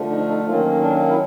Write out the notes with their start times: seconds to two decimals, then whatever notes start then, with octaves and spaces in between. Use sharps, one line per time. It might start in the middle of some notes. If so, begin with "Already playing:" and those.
Already playing: D3 F3 A3
0.11 D#4
0.29 D#4
0.46 D#3 F#3 A#3 C#4 F4
0.81 D4
1.09 E4